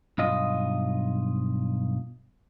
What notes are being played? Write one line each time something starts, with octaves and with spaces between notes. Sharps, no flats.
B1 G2 F4 D#5